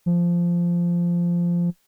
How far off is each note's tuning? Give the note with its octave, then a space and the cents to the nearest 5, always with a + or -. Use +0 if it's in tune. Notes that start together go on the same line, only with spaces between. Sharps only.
F3 -10